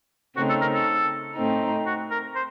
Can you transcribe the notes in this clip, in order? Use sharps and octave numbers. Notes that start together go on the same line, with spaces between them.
C#3 A3 C4 D#4 F#4
A4
A#4
A4
A2 A3 C4 D#4
F#4
A#4
C5